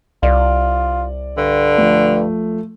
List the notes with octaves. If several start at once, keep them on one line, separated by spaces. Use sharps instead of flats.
C2 F4 D5
G2 D3
F3 A3